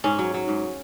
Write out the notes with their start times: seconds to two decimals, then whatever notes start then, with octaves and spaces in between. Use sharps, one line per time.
0.04 G#2 C#4
0.19 F#3
0.34 F#3
0.48 G#2